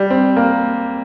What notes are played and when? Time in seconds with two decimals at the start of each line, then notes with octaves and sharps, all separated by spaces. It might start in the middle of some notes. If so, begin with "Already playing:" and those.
Already playing: G3
0.10 C4
0.37 A#3